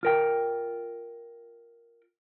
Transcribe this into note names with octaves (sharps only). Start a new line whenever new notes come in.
F4 A#4 G5